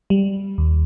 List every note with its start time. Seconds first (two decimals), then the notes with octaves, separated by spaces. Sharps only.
0.10 G3
0.58 D#2